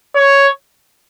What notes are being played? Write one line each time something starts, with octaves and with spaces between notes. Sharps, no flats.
C#5